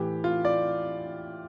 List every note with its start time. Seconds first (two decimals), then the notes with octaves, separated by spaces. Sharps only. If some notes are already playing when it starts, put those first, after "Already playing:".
Already playing: A2 E3 G4
0.24 F4
0.45 D5